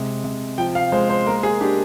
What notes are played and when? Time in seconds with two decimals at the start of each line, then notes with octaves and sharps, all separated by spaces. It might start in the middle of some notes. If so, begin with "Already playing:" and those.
Already playing: C3 G#3
0.24 C3
0.58 F3 G5
0.75 F5
0.92 G#3 C5
1.09 C5
1.26 A#3 A#4
1.43 G#4
1.61 D4 G4